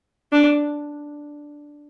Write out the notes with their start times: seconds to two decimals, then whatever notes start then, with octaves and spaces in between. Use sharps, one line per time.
0.33 D4